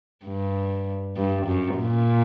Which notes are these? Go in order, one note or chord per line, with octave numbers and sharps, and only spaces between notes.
G2
G2
F#2
A#2